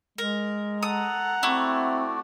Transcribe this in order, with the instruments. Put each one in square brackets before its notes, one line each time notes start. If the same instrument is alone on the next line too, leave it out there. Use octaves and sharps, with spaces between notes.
[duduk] G#3 [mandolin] A#4
[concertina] A4 [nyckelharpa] F#5 A#5 [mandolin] D#6
[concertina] A3 F#4 D5 [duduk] C4 [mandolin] E4